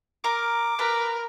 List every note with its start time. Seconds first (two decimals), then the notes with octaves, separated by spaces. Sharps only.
0.24 A#4 D6
0.79 A#4 B4